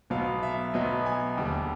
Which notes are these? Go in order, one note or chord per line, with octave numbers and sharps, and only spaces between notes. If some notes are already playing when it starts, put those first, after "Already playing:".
B1 B2 F#3 B3 F5
E5
B1 B2 F#3 B3 D#5
G#5
E1 D#2 D3 G3